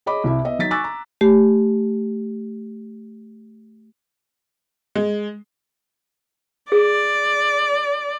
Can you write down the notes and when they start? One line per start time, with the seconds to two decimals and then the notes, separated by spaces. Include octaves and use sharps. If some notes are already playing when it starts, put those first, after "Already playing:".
0.06 G#4 C#5 D#5 B5 D6
0.24 C2 C3 E4 E5
0.45 B3 D#5 E5
0.59 F#3 D#4 A6 B6
0.71 G#5 C#6 D6 E6 F#6 A6
0.84 A#5
1.21 A3 G4
4.95 G#3
6.72 G#4 D5